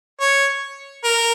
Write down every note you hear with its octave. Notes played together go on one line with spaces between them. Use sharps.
C#5
A#4